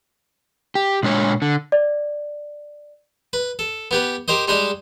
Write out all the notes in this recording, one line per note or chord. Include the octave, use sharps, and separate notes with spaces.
G4
A#2 G#3 D4 C#5
D3
D5
B4
A4
B3 G4 B4
G4 A#4 C5 D#5
G3 G#3 D4 G4 D5 D#5